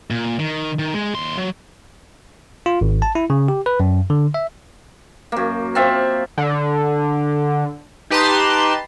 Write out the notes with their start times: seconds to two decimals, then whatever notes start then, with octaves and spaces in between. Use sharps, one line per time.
0.11 A#2
0.39 D#3
0.79 D#3
0.94 G#3
1.14 D#2 C6
1.37 F#3
2.66 F4
2.81 G#1
3.02 A5
3.15 E4
3.30 C#3
3.48 G4
3.66 B4
3.80 F#2
4.10 D3
4.34 E5
5.32 F#2 A#3
5.75 C4 F4 E5
6.38 D3
8.10 D#4 G4 B4 A5 A#5 C6